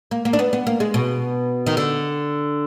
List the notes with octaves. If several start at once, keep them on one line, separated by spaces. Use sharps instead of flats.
A#3
A#3
D4
B3
B3
A#3
G#3
B2
D#3
D3